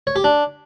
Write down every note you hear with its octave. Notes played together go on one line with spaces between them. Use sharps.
C#5
G4
D4